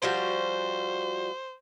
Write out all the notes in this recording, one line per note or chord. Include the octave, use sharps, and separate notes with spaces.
F3 G3 F#4 C5